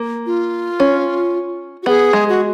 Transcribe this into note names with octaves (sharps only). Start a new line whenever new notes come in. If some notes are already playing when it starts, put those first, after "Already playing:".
Already playing: A#3
F4
C#4
F#4
B3 G#4
G#3
F#4